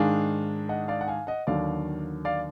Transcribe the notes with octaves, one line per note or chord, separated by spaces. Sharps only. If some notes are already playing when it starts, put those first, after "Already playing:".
Already playing: G#2 D#3 G#3 D4 F5 G#5
D#5 F#5
D5 F5
F#5
F5 G#5
D#5 F#5
D#2 D3 F#3 D5 F5
D5 F5